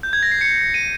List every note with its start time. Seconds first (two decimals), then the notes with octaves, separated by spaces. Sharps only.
0.03 G6
0.13 G#6
0.23 A#6
0.31 C7
0.41 C#7
0.74 D#7